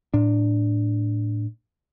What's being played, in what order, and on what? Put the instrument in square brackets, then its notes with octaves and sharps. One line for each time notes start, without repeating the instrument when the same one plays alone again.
[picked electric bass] A2 D4